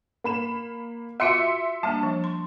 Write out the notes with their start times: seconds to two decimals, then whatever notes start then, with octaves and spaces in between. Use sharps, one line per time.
0.24 A#3 B5 E7
1.20 B3 F4 F#4 E5 C6 C#7
1.83 G3 A#3 D4 A5
2.03 F3
2.24 C6